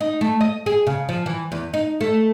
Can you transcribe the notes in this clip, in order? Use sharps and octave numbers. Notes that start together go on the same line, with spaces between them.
D#4
A3
D#5
G#4
C#3
F3
E3
E2
D#4
A3